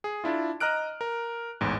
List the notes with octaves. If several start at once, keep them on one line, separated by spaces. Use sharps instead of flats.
G#4
D4 E4 F4
D#5 A#5 F6 F#6 D7
A#4
A1 E2 G#2